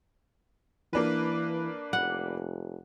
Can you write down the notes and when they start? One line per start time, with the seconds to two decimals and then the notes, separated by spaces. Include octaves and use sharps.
0.93 E3 A#3 D4 B4
1.93 F1 F#5